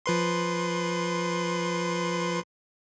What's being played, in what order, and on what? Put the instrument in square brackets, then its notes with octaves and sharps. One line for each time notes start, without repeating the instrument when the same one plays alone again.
[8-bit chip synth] F3 B4 C6